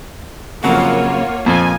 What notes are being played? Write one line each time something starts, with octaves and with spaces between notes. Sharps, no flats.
F2 C#3 F#3 A#3 F4 C#5 F#5
F2 A#2 F3 G#5